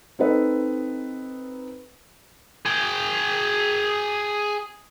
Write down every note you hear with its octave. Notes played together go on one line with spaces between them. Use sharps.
C4 D#4 A4 B4
G#4 G5